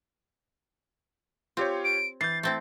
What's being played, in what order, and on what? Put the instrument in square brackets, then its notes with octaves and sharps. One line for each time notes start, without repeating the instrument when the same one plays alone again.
[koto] C4 [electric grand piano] F4 G4 C#5
[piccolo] D7
[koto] E3 [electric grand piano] G6 C7 [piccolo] A6
[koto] A3 C4 E4 [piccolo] A6